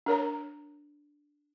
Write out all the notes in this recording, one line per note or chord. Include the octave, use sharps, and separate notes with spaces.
D4 A#4 C#5 A#5